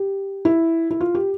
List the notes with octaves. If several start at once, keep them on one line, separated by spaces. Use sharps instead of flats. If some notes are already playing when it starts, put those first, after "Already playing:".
Already playing: G4
E4
E4
F4
G4